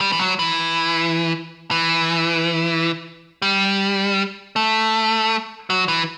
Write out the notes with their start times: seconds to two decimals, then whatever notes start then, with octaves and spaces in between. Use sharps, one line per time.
0.01 G3
0.12 E3
0.19 F#3
0.39 E3
1.71 E3
3.42 G3
4.56 A3
5.70 F#3
5.88 E3